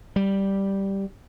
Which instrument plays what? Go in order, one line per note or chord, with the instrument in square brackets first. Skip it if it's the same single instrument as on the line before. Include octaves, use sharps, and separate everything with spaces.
[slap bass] G3